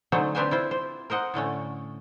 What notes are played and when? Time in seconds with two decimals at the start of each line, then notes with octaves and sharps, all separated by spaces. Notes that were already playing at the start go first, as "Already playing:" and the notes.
0.12 D3 F#3 A3 C#4 D#4 C5
0.35 C4 D4 G4 B4 C5 G#5
0.51 E4 F4 C5
0.71 C5
1.10 A#4 C5 D#5 F#5
1.34 A2 D3 A3 C#4